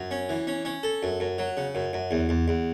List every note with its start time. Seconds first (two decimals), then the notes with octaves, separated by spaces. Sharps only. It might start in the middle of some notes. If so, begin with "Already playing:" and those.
Already playing: F#2
0.11 C#4
0.29 E3
0.47 C#4
0.65 C#4
0.83 A4
1.03 F#2
1.20 F#2
1.38 F#3
1.57 C#3
1.75 F#2
1.93 F#2
2.11 E2
2.29 E2
2.48 E2